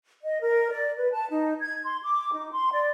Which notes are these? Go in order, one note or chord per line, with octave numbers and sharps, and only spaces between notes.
D#5
A#4
D5
B4
A5
D#4
G#6
C6
D6
D#4
C6
D5